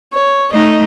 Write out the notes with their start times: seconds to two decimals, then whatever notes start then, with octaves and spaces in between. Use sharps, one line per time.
0.13 C#5
0.52 A3 D#4 D#5